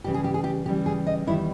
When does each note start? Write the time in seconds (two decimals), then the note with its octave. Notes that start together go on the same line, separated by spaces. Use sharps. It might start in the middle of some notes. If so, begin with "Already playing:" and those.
0.04 C#3 E3 G3 G4
0.14 G#4
0.24 G4
0.34 G#4
0.44 G4
0.66 C#3 E3 G3 G4
0.86 G#4
1.07 D#5
1.27 E2 D#3 G3 E4